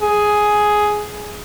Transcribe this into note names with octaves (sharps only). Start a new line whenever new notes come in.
G#4